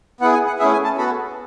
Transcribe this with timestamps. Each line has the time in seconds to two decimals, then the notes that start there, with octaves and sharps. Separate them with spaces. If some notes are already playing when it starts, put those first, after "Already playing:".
0.21 B3 E4 G#4 F#5
0.33 G#5
0.47 F#5
0.59 A3 C#4 E4 G#4 E5
0.72 G#5
0.84 A5
0.97 B3 F#4 A4 B5